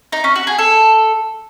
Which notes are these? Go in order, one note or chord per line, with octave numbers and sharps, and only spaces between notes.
D#4
C#4
F#4
G#4
A4